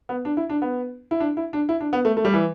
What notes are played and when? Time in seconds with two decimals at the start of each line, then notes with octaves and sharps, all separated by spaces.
0.09 B3
0.25 D4
0.37 E4
0.50 D4
0.62 B3
1.11 E4
1.20 D4
1.37 E4
1.53 D4
1.69 E4
1.81 D4
1.93 B3
2.05 A3
2.17 A3
2.25 G3
2.34 E3